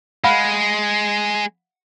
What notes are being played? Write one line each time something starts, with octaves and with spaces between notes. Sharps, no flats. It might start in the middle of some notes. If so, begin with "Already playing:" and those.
G#3 F5 F#5 B5